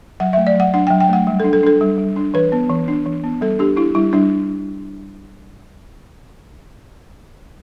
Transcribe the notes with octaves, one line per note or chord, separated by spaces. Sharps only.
F#3 F#5
E5
A3
D5
F#3 F#5
D4 F#5
G5
F#3
G5
A3 F#5
G3
A4
D4
A4
D4 A4
G3
G3
D4
E3 B4
B3
E3
D4
E3
B3
G3 A4
D4 G4
D4 E4
G3 E4
G3 D4